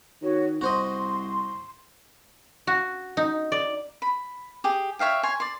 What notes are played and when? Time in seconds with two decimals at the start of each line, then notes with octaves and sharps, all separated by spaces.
0.22 D#3 F#4 C#5
0.61 C2 F#4 C5 D#5 C6
2.67 F#4
3.17 D#4
3.52 D5
4.02 B5
4.64 G4 G#4
4.99 C#5 E5 F5 G5
5.23 C#5 G#5 C6
5.40 D5 C6